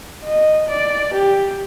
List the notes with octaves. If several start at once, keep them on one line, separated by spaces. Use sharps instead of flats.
D#5
D5
G4